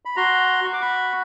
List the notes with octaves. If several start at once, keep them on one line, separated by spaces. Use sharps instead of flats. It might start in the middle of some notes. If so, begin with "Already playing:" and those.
B5
F#4 A#5 C6
F#4 C#6
D6
B5 C#6